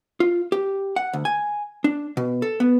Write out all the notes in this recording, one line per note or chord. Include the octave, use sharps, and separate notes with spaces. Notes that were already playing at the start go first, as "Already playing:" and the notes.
F4
G4
F#5
D2
G#5
D4
B2
A4
B3